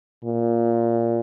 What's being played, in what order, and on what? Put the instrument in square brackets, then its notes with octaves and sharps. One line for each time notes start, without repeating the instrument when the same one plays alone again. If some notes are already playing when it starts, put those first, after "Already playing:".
[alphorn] A#2